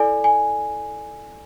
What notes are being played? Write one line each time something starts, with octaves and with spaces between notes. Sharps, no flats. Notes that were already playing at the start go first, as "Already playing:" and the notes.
Already playing: E4 A4 D5 G#5
G#5